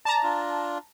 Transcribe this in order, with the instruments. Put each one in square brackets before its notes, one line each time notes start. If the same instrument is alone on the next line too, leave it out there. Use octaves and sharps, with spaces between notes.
[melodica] D5 [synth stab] A5 A#5
[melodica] D4 F4